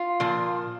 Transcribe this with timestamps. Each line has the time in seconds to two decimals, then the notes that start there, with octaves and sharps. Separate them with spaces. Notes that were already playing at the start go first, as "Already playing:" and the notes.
Already playing: F4
0.20 A#2 F3